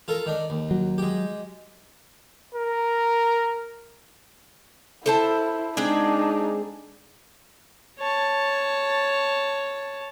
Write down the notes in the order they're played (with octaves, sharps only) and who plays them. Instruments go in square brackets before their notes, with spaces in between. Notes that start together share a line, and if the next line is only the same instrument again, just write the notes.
[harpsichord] F4 A4 A#4
D#3 D4
D#2
[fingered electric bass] F#3
[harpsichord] G#3 G4
[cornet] A#4
[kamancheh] E4 [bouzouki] A4 C5 A5
[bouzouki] G#3 C4 G#4 [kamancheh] D4 D#4
[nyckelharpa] C#5 A5